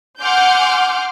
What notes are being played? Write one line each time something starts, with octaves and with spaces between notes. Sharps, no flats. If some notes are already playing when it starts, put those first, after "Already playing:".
F#5 G#5 C6 D6 F6 G6